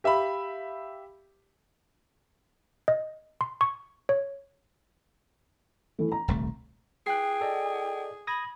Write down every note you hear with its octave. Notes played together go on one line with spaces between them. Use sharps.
G4 E5 F5 B5
D#5
C6
C#6
C#5
E3 A3
A#5
D#1 C2 A3
G#4 G5 F#6 C7
A4 D5 D#5
B5 D#6 G#6 A#6